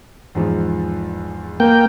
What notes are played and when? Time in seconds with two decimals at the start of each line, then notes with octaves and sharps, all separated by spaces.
0.35 E2 G#2 F3
1.60 A#3 G5